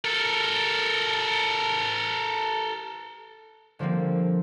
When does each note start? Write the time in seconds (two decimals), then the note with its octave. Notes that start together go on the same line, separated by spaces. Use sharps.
0.05 A4 A#4
3.79 D3 F3 G3 A#3 C4